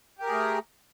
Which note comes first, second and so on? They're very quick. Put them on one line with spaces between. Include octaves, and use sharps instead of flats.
G4 A#4 G#4 A3